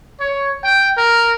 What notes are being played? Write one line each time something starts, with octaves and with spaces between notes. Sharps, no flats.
C#5
G5
A#4